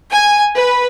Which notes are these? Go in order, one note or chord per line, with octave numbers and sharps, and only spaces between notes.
G#5
B4